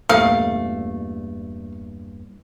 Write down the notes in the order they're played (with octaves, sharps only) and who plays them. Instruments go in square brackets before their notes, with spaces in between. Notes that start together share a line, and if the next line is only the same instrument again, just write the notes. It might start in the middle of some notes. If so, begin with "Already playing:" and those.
[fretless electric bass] E2 G2 A#2 [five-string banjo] A3 [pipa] F5